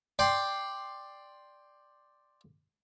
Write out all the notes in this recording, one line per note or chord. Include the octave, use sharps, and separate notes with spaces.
D5 G5 C6